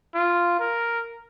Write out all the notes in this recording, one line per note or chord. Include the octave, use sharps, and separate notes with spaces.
F4
A#4